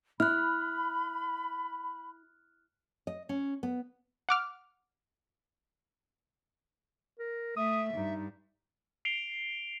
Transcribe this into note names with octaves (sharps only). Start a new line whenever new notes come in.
E4 B5 F6 F#6
D#5
C#4
B3
F#5 D6 F6
A#4
A3 E5 D#6
G2 D#4
C7 D7 F7 G7